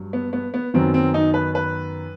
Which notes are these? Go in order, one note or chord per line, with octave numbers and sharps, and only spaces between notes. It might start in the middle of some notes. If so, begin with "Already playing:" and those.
Already playing: G2 F#3
B3
B3
B3
F#2 D#3 F#3 B3 C4
C4
D#4
B4
B4